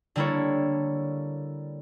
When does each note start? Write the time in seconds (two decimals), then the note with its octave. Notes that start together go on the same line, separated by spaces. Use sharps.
0.16 D3 G3 A#3 E4 A4 C#5